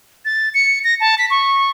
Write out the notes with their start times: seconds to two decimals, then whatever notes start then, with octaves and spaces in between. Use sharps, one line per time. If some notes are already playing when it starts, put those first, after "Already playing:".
0.25 A6
0.54 C#7
0.84 A#6
1.00 A5
1.18 B6
1.30 C#6